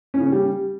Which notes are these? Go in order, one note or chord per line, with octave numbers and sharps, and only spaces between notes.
C#4
C#3
C#4
G3